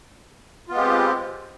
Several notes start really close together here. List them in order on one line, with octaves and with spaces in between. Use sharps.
F4 B3 G#3 G4 C4